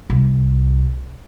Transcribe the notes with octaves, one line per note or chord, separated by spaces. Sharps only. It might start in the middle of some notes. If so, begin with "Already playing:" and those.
C2